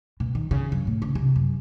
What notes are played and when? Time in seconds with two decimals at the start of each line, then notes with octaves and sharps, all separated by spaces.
0.20 B2
0.35 D#3
0.51 C#3
0.72 F#2
0.87 A2
1.02 C#3
1.15 C3
1.36 F#2